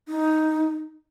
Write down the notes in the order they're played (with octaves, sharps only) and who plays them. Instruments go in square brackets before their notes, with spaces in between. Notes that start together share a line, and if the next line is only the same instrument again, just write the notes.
[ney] D#4